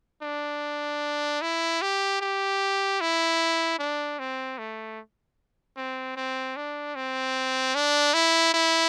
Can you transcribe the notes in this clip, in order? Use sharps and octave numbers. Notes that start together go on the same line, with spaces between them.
D4
E4
G4
G4
E4
D4
C4
A3
C4
C4
D4
C4
D4
E4
E4